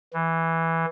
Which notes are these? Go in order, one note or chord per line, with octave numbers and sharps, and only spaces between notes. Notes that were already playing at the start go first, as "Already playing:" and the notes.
E3